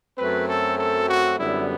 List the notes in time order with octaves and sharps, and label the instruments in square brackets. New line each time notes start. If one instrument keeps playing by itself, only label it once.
[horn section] F#2 F#3 A3 C4 B4
A4
A4
F#4
F#2 D3 G3 B3 E4